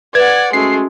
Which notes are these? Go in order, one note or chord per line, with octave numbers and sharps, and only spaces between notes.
B4 D5 F#5 G#6
G#3 A3 C#4 F#4 C7